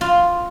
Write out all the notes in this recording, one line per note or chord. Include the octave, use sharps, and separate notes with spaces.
F4